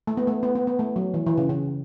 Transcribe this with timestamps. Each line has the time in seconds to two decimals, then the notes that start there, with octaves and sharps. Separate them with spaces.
0.07 A3
0.17 B3
0.27 A3
0.43 B3
0.55 B3
0.67 B3
0.79 A3
0.96 F#3
1.14 E3
1.26 E3
1.38 C#3
1.49 C#3